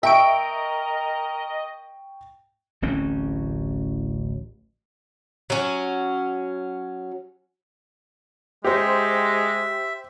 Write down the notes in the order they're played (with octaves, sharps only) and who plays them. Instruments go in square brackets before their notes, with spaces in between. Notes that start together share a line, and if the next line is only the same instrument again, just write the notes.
[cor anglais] A#4 [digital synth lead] D#5 [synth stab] E5 D7 [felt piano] G5 C#6
[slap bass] D1 A1 C4 C#4
[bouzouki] F#3 C#4
[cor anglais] G#3 [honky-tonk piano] G4 C5 [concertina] E5